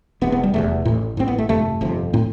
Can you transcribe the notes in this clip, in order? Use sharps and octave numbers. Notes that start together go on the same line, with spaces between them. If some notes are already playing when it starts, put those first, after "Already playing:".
E1 E2 C3 B3
B3
G3
E1 E2 C3 A3
A1 A2
A1 A2 C4
B3
A3
G1 F2 C3 A3
G1 F2 C3
A2 C4